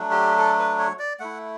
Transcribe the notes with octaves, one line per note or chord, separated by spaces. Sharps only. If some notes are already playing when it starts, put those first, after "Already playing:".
Already playing: F#3 A3 D4
G4
A4
B4
C#5
D5
A3 E4 F#5